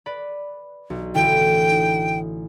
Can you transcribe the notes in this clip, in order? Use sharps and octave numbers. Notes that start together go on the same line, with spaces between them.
B4 D5 B5
B1
A1 D3 E4 G5
D#4